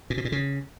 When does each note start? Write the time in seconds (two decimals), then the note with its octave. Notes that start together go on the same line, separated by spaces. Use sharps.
0.10 A#2
0.18 B2
0.25 A#2
0.32 C#3